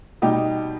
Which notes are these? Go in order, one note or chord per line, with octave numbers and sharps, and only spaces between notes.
B2 G3 D#4 G4